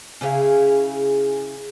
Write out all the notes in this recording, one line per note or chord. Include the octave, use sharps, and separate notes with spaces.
C#3 E4 G#4 F5